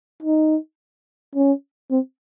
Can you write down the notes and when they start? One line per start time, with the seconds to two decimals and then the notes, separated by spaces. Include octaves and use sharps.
0.23 D#4
1.35 C#4
1.91 C4